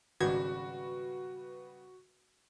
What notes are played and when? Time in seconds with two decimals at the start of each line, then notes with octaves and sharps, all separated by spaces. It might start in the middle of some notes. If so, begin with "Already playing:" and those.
0.20 G#1 C#3 G3 F#4 B4 G#6